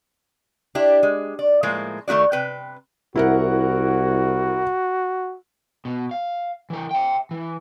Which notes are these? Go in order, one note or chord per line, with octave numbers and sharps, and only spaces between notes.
D4 E4 G4
G#3
D5
A2 F3 G#3 A#3
D#3 A3 E4 F#4 D5
C3 B4 G5
C2 E4 F#4 A#4 F#5
B2
F5
E3 A#4
E5 G5
E3